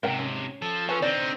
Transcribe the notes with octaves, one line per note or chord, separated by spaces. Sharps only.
G#2 C3 A#4 F#5 G5
C#4
F3 A4
C#4 A4 B4 A5
D3 C4 D#4 D5